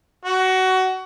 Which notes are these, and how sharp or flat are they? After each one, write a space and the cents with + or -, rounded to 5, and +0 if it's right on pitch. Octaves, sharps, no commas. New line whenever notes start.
F#4 +20